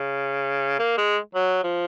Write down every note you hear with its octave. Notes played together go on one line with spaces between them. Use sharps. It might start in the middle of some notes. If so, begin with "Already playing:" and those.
Already playing: C#3
A#3
G#3
F#3
F3